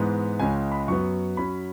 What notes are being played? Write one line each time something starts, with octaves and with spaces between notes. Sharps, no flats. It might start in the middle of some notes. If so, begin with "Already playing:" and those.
Already playing: G#2 E3 G#3 B3
C#2 C#3 G#3 C#4 G#5
B5
F#2 F#3 B3 C#6
F#2 F#3 C#4 B5